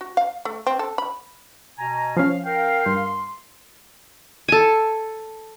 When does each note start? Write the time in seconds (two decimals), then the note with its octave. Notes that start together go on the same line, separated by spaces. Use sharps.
0.01 F#4
0.17 F5
0.45 A3
0.67 C4
0.79 A4
0.98 B5
1.78 B2 G#5 A#5
2.17 F3 C#4 F5
2.45 A#4 F5 G5
2.86 G2 C6
4.48 A4 G#5